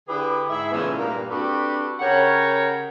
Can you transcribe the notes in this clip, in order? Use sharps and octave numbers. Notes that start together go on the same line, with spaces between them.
D3 E4 G4 G#4 B4
G#2 E4 G#4 E5
A#2 C#3 E3 G#3 A3 B3
G2 A#2 A#3
C4 D4 F#4 G4 A4 B4
C#3 G4 A#4 C#5 F#5